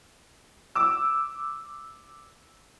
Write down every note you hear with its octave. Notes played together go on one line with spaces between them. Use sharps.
D6 E6